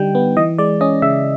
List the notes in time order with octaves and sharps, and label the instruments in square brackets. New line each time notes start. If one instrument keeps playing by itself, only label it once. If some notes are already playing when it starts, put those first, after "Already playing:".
Already playing: [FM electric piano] D3 G3 D#4 G5
B3
E3 D#5
G#3 D5
C#4 D#5
C#3 E5